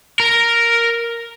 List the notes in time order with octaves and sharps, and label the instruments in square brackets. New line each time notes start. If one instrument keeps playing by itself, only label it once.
[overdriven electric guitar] A#4